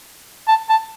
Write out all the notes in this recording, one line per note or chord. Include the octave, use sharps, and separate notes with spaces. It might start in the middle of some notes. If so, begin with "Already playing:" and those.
A5
A5